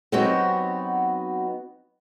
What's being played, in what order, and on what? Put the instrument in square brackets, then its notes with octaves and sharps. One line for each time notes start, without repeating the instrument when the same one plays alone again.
[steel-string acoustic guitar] F#3 B3 C4 D#4 F#4 G4